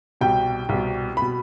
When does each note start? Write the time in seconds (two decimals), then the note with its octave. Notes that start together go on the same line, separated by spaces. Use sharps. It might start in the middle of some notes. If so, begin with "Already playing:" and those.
0.21 C2 B2 G5
0.69 C2 B2
1.17 B5
1.22 B2